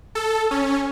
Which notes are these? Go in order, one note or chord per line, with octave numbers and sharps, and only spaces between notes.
A4
C#4